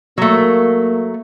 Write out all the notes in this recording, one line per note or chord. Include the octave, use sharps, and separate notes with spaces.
F#3 A3 A#3